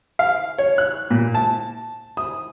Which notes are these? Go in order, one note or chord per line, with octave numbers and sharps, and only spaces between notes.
F5
C#5
F#6
A#2
A5
D#6